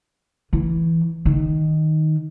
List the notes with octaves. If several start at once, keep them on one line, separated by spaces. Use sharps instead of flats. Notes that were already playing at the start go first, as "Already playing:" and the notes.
E3
D#3